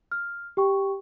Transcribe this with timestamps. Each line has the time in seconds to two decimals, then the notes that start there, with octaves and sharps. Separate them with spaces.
0.11 F6
0.57 G4 G5 C#6